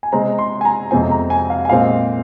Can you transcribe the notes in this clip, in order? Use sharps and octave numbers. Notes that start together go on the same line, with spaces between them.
G#5
C3 G#3 C4 A#5
C6
G#5
A#5
F2 C3 G#3 C4 G#5
A#5
G#5
F5
G#5
A#2 G#3 C4 F5